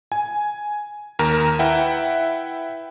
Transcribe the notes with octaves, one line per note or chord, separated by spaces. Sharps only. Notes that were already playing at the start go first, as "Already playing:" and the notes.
G#5
D#2 A#4 A#5
E4 B4 E5 F#5 G5